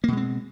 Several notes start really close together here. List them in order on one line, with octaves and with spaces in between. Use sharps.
A#3 B2 G#3 C4